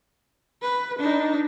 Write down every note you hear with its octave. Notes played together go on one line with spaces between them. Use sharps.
B4
D4 D#4